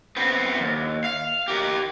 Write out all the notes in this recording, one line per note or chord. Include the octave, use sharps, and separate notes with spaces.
B3 C4
D#2
F5
G4 A#4